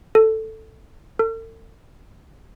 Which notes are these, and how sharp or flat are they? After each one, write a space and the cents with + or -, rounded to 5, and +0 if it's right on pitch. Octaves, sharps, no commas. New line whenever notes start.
A4 +5
A4 +40